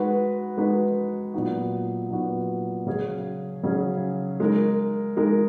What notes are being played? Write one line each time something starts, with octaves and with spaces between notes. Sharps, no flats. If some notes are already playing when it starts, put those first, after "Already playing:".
Already playing: G#3 D#4 F#4 B4
G#3 D#4 F#4 B4
A#2 F#3 B3 D#4 F#4
A#2 F#3 B3 D#4 F#4
C#3 F#3 C#4 G#4
C#3 F#3 C#4 G#4
G#3 D#4 A#4
G#3 D#4 A#4